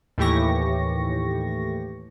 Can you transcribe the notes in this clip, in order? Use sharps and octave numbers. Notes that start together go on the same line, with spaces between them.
D#2 A2 E3 G4 C#6 A#6